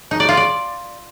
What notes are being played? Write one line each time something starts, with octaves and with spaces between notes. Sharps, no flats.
D#4
D5
F4
D5